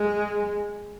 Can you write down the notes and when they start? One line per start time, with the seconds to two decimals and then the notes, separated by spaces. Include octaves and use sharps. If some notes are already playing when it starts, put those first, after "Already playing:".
Already playing: G#3